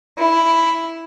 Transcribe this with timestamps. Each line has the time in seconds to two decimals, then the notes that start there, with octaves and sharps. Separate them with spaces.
0.17 E4